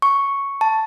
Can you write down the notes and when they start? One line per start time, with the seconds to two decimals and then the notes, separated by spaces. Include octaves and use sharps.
0.02 C#6
0.61 A5